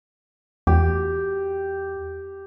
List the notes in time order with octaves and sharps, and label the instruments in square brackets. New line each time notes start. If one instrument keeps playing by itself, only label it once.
[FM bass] E2 [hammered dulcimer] G4